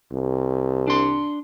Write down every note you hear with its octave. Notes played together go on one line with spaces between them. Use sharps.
C2
D4 C6